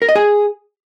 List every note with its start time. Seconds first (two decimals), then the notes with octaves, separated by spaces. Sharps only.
0.02 A#4
0.09 D#5
0.15 G#4